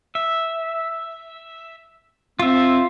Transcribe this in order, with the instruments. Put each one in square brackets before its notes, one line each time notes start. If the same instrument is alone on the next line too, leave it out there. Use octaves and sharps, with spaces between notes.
[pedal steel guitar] E5
[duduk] C4 [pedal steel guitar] F4 E5